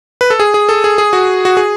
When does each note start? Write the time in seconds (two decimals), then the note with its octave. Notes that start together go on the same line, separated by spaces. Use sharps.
0.21 B4
0.30 A4
0.40 G#4
0.54 G#4
0.69 A4
0.84 G#4
0.98 G#4
1.13 F#4
1.45 F#4
1.57 G#4